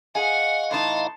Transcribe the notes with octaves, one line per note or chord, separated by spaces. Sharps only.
G#4 D#5 F5 F#5 G#5 C#6
A2 E3 D#4 A5 C6